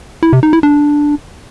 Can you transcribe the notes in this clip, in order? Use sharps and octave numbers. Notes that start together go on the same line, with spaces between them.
E4
C3
D#4
E4
D4